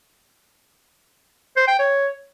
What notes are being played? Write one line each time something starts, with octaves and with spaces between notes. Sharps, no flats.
C5
G5
C#5